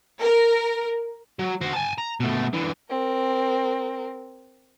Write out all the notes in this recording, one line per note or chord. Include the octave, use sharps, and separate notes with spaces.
A#4
F#3
F#4 C5
G#5 A5
A#5
B2 A3
D3 E3
C4 A#4